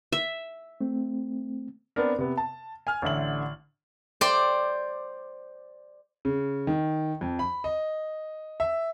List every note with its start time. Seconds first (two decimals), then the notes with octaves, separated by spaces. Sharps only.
0.13 E5
0.81 A3 C4
1.96 B3 C4 D4 A#4
2.18 C3 B3
2.37 A5
2.87 G#5 F6
3.02 A1 D3 E5 F#7
4.21 C5 D5 G5
6.25 C#3
6.67 D#3
7.21 F2
7.39 B5
7.64 D#5
8.60 E5